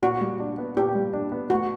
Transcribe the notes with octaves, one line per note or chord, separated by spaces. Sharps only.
A#2 F#4
G3
D4
B3
A#2 G4
G3
D4
B3
A3 F#4